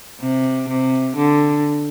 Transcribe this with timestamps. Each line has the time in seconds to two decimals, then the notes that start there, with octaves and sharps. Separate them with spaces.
0.21 C3
0.69 C3
1.16 D3